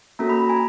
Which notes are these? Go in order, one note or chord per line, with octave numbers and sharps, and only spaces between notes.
A#3 C#4 F#4 A4 A#5
B5
A#5
G#5